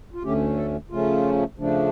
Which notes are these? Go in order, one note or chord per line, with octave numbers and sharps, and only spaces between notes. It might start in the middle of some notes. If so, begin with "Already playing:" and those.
F4
D2 D3 A3 C#4 G4
A4
C#3 F3 A3 C#4 F4
C#3 F3 A3 D4